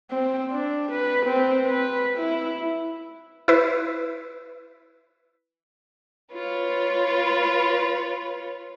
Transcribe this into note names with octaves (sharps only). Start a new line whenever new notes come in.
C4
D4
B4
C4
B4
E4
E4 B4
F4 B4 C#5